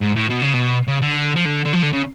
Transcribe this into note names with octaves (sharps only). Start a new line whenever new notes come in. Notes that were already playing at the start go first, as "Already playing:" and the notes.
G#2
A2
B2
C#3
B2
C#3
D3
F3
D3
D3
F3
D3
C#3